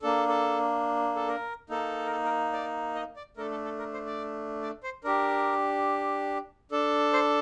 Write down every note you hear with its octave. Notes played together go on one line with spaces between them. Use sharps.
A#3 D4 A4
A4
A4
A#4
A#3 D#4 A4
A#4
A4
A#4
D5
D#5
D5
A3 D4 A4 A#4
A4
A4
A#4
C5
D5
D5
C5
D4 G4 A#4
D4 A4
C5